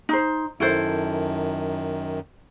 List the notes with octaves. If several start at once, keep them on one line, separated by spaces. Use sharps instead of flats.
D#4 C5
F#2 D#3 E4 A4 C5